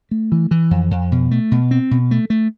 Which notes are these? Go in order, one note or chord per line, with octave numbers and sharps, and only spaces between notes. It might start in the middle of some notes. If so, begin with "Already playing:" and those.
A3
E3
E3
F2
F2
B2
A3
B2
C4
B2
A3
A3